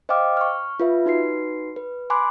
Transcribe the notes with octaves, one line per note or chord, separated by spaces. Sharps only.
C5 D#5 F5 G5 D6 F6
C#6 F6
F4 B4 E5
D#4 F#4 B4 C7
B4
G#5 B5 C6 D6 F#6